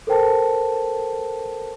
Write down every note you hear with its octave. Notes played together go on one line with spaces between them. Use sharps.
A4 A#4 C5 G5 A5